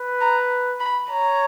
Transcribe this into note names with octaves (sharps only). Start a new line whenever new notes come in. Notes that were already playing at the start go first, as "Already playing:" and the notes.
Already playing: B4
A#5
B5
C#5 A#5